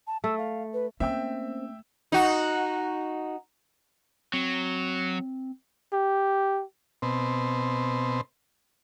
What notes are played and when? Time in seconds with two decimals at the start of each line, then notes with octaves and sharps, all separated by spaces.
0.07 A5
0.24 A3 E6
0.38 F5
0.73 B4
1.00 A3 A#3 C4 C#4 E5 G5 E6
2.12 D#4 F#4
4.33 F#3 C4
5.93 G4
7.02 B2 C4